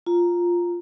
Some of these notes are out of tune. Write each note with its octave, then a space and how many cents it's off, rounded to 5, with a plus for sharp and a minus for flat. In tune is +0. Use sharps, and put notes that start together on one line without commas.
F4 +0 A#5 +0